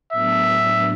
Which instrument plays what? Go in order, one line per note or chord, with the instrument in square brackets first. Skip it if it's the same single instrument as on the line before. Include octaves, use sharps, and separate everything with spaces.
[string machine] A2 F#3 B3 D4 [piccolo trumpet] E5